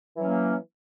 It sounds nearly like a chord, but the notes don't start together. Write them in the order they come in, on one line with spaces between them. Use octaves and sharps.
E3 F#3 C#4 A#3